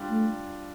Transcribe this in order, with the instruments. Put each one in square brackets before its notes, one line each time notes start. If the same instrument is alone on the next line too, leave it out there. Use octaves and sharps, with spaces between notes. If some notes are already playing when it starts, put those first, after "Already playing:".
Already playing: [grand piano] G3 D4 F4
[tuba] A3